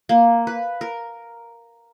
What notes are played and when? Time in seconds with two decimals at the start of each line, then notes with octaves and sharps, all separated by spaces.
0.09 A#3
0.47 B4
0.81 A#4